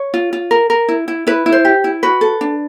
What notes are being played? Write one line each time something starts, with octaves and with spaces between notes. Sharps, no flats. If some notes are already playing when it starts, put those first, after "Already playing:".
Already playing: C#5
F4
F4
A#4
A#4
E4
E4
E4 B4
E4
C5
G4
E4
F#4 B4
A4
D4